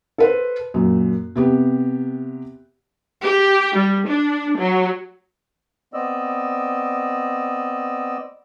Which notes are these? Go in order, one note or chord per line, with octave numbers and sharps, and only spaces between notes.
A4 B4 C5
F#2 A#2
C3 B3 G4
G4
G3
D4
F#3
B3 C4 D5 D#5 E6